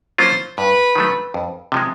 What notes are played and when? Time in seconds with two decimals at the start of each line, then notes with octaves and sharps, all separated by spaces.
0.18 F#3 A#3 C#4 F4 C5
0.57 G2 B4
0.95 D#3 F#3 A3
1.34 F2
1.72 C3 F3 G#3